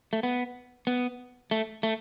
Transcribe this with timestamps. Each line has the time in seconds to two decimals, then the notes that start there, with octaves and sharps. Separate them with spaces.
0.13 A3
0.23 B3
0.87 B3
1.51 A3
1.83 A3